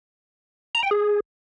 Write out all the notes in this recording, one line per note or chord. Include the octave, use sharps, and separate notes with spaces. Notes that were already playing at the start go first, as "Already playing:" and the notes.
A#5
G5
G#4